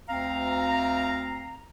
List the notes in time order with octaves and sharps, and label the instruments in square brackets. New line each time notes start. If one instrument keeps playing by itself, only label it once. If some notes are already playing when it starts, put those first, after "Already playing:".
[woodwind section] D2 C4 F5 A#5